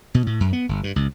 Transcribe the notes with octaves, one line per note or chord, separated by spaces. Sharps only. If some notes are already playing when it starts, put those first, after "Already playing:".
B2
A2
F#2
B3
G1
G2
C#2